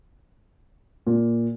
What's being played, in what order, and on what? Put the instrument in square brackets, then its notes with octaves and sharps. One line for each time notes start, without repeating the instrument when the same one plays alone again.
[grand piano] A#2